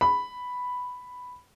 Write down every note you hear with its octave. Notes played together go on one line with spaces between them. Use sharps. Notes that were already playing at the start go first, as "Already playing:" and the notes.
B5